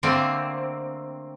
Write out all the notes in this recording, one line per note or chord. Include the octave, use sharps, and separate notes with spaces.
D3 A3 A#3 C4